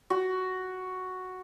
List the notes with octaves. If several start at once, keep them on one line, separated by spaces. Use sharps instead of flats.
F#4